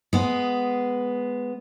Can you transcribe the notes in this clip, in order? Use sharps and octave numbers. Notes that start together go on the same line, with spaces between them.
G#3 B3